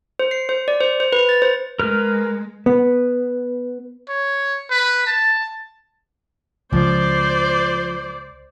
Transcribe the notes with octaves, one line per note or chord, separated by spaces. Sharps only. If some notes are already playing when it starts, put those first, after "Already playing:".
C5
C7
C5
D5
C5
C5
B4
A6
C5
G#3 A#4 B4 F6
B3
C#5
B4
A5
C#2 F3 C5 D5